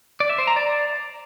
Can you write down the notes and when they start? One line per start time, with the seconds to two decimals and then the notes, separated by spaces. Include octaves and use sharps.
0.20 D5
0.29 E5
0.38 C5
0.47 A#5
0.56 D5